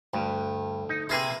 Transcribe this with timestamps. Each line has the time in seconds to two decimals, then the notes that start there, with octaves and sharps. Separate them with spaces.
0.13 D2 G2
0.89 D#4
1.09 C3 A#3 E4 G#4 B4 G#5